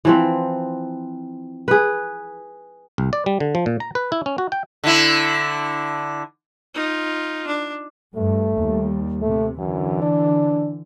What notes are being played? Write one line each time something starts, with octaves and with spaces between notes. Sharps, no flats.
E3 F3 C4
G#4 B4
C2
D5
G3
D3
F3
A#2
A#5
B4
E4
C#4
F#4
G5
D3 E4
D#4 F4
D4
G2 A3
D#2 G3
C3 A3
F#2 D3 E3
D4